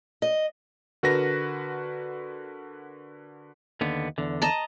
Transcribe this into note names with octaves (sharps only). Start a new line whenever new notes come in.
D#5
D3 F#4 A#4 B4 A#6
D#2 D3 B3
E2 D3
D#5 A5 A#5